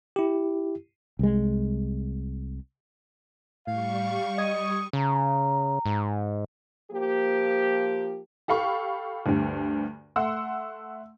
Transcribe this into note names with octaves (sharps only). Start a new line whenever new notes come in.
E4 G4
C2 G#3
A2 G3 F5 C#6
D#5 D#6 G#6
C#3 A#5
G#2
F3 A#3 G4
G4 A4 F5 B5 C#6
D2 G2
A3 F#5 C6 E6